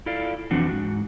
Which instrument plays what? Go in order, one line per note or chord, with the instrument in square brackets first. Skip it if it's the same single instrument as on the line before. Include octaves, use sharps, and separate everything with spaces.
[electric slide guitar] E4 F4 A4 D5 F5
F2 E3 C4 D4 F#4
G#2 F#4